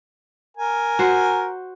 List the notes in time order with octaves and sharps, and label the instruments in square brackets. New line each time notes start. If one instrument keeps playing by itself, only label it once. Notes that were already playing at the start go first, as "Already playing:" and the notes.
[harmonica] A#4 G#5
[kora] F#4 C5